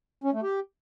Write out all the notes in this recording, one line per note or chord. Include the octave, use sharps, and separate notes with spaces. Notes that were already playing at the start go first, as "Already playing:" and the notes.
C#4
A3
G4